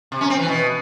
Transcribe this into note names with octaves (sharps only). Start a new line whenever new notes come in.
C3
C#4
C4
E3
B2